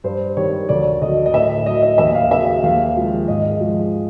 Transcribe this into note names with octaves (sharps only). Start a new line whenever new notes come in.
G2 C5
D#3 G3 C#5
D2 D5
D3 F#3 D#5
D#5
A2 E5
F#3 D#5
D#5
D#2 E5
F5
C#3 F#3 E5
D#2 F5
C#3 F3 G#3
G#2 D#5
F3 G#3